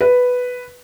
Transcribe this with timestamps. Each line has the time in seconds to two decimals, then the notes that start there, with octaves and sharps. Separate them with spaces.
0.01 B4